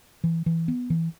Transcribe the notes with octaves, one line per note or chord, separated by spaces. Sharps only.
E3
E3
B3
E3